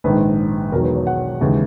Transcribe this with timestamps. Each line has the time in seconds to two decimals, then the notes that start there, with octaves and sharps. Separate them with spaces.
0.04 A#1 G#2 D#3 G#3 B4
0.72 E1 E2 D#3 F#3 A#4
0.84 B4
0.95 C#5
1.07 F#5
1.41 D#2 C#3 E3 G#3